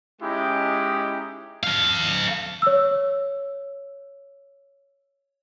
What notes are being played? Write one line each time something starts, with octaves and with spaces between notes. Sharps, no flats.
G#3 C#4 D#4 E4 G4
A4 F5
C#5 E6